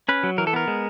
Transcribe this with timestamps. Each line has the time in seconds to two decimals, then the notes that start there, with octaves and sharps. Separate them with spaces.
0.09 C#4 B4
0.23 F#3
0.38 E3 A#4
0.47 A4
0.53 B3 A#4
0.68 G#3